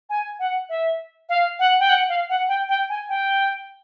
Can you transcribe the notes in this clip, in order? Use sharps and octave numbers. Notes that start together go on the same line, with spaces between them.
G#5
F#5
E5
F5
F#5
G5
F#5
F5
F#5
G5
G5
G#5
G5